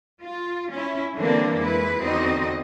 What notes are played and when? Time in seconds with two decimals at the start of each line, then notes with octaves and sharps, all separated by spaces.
0.23 F4
0.72 C#4 E4
1.17 D3 E3 G3 A#3 C4 D4
1.57 F2 G#3 E4 B4
2.00 E2 D3 C4 D#4 F#4 D#5